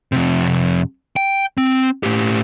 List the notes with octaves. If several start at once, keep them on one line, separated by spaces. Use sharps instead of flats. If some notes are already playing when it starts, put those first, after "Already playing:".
F2 C3
G5
C4
A2 G4